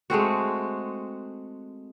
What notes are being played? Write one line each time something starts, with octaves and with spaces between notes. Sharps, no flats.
G#3 A3 C4 F#4